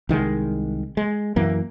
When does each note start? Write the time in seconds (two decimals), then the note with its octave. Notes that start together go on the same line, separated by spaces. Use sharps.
0.09 C2 D#3 E3 G#3
0.97 G#3
1.36 F#2 E3 A#3